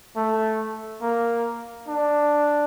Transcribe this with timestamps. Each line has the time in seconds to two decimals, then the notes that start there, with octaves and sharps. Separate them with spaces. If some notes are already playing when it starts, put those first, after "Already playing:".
0.16 A3
1.01 A#3
1.88 D4